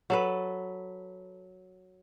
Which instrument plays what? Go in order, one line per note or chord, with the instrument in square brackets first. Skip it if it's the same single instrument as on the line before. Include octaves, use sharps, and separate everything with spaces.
[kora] F#3 A4 B4